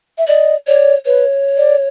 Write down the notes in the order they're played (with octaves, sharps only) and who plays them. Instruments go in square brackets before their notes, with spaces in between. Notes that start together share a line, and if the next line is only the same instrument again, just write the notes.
[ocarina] E5
[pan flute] D5 [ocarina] D#5
[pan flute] C#5 [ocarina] D5
[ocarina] B4 [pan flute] C#5
[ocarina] D5